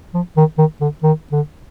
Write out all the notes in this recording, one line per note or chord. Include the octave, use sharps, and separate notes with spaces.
F3
D#3
D#3
D3
D#3
D3